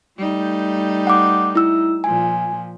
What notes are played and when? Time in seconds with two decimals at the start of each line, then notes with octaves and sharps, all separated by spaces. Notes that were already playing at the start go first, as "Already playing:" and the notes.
0.18 G3 A3 D#4
1.07 F#5 D6
1.55 E4 E6
2.04 A#2 F3 G#5